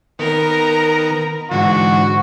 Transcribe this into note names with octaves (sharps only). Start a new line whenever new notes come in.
D#3 B3 A#4 A#5
G#2 D3 E3 F#4